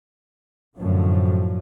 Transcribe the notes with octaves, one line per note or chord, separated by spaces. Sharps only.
F#2 A2 D3 F3 F#3